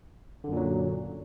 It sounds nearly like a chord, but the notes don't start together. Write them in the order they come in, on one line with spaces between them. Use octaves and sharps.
D3 F#2 A#2 F#3